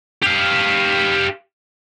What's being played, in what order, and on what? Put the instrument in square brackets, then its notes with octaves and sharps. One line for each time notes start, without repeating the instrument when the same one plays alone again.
[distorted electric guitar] G4 F5